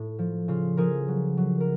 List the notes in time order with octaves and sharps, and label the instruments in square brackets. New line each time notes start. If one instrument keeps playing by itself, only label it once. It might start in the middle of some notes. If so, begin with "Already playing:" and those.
Already playing: [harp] A2
F3
C#3 F4
F3 G#4 A#4
F#3
F#3
A#4